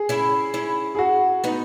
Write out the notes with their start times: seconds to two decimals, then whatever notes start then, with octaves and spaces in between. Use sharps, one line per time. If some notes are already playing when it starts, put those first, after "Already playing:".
Already playing: G#4
0.09 C#4 E4
0.54 C#4 E4
0.95 G#4
0.99 F#4
1.44 B3 D#4